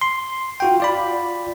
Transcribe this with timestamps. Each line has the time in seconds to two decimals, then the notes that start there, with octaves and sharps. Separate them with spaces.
0.01 C6
0.60 F4 F#4 G5
0.80 F4 D5 B5